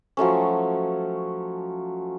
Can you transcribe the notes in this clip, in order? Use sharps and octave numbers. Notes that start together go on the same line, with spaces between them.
F3 F#3 A3 C#4